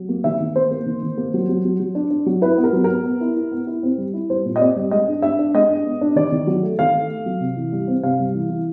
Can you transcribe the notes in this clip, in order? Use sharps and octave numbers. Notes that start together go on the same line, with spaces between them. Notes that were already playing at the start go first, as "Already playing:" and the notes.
Already playing: F#3
A#3
D#3 E5
D#3
A#3 C5
A#3
D#3
D#3
A#3
F#3
F#3
F#3
F#3
D4
D4
F#3
E4 B4
B3
A#4
F#3
B3 A#4
B3
E4
E4
B3
E4
C4
G3
E4
G3 C5
A#2
D#5
C4 D5
G3
G#3 D#5
D4
D4 E5
D4
G#3 D#5
D4
B3
D4
D#3 D5
D#3
F#3
A3
D#3 F5
A3
A3
F#3
C3
E3
G3
C4
C3 F5
G3
E3
E3